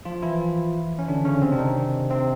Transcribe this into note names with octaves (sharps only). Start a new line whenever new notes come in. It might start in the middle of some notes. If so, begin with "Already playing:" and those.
F3 F4
E3 E4
C#4
D3 D4
C#3 C#4
C3 C4
D4
D#3 D#4
C3 C4